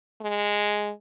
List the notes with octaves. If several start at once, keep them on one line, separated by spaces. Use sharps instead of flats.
G#3